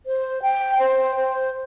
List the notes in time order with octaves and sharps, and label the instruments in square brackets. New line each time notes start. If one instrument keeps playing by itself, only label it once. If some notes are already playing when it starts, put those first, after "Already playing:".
[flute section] C5
G5
C5
C5